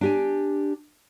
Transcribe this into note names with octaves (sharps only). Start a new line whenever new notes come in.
D4 G4 G#5